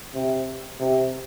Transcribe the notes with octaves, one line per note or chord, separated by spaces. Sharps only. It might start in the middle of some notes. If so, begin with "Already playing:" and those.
C3
C3